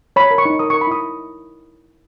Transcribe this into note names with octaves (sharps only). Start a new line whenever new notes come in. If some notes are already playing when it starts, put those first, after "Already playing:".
C#5 B5
A#4
C#6
D#4
A#4 D#6
C#6
A#4
B5
E4 D#6